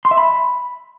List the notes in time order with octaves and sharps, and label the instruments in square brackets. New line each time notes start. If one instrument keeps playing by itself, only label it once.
[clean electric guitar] C6
E5
B5